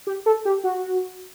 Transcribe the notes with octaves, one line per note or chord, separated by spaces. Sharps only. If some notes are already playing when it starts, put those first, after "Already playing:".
G4
A4
G4
F#4